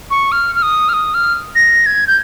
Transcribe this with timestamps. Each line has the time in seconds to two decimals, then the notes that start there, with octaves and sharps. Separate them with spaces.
0.11 C#6
0.32 F6
0.55 F6
0.62 D#6
0.89 F6
0.93 D#6
1.14 F6
1.55 A#6
1.86 G#6
2.07 G6